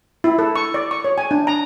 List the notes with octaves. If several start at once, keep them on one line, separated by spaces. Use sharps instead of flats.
E4
A4
C#6
D5
C#6
C#5
G#5
D4
A#5